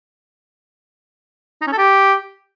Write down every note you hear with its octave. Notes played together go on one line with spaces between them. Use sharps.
D#4
C#4
A4
G4